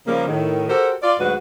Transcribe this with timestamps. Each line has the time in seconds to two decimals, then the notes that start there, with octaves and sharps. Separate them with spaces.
0.07 C#3 F3 G3 A#3
0.27 A2 D#3
0.68 F#4 G4 A4 A#4 C5
1.02 F4 D5
1.19 D2 G#2 F#3 F#4 B4